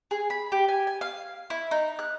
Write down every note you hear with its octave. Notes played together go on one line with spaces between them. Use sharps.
G#4
B5
G4
G#5
G#5
F5
E4
D#4
F#6